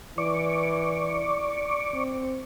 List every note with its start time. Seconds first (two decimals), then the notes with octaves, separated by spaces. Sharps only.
0.18 E3 D5 C#6 D6
1.94 C4